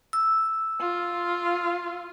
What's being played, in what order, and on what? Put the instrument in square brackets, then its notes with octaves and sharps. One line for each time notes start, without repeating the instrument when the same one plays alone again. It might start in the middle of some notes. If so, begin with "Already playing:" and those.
[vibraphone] E6
[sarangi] F4